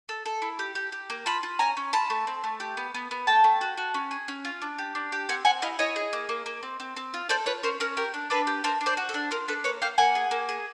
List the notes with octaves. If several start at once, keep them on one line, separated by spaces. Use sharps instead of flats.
A4
A4
E4
G4
G4
G4
A#3
F4 A5 B5
F4
C#4 G#5 A#5
C#4
F4 A5 B5
A3
C4
A3
G4
B3
B3
B3
A3 G5 A5
A3
F#4
F#4
C#4
G#4
C#4
F4
D4
G4
D4
G4
C4 F#5 G#5
C4 F#5 G#5
E4 D#5 F5
E4 C#5 D#5
G#4
A#3
A#3
A#3
C4
C4
C4
F4
A4 C5 D5
F4 B4 C#5
C#4 A#4 C5
C#4 A#4
G4 A#4
D4
D4 A4 B4
G4
D4 A#4 C5
D4
C5 D5
F#4
A4
D4
F4 A#4
D4 A4 B4
A#3 B4 C#5
A#3 F5 G5
A#3 F#5 G#5
G#4
A#3
G#4